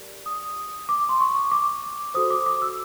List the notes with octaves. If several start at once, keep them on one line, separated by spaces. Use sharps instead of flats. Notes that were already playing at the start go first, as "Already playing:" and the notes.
Already playing: G4 A#4 D5
D#6
D6
C6
C#6
D6
F#4 A4 C5 D#6
D6
D6
E6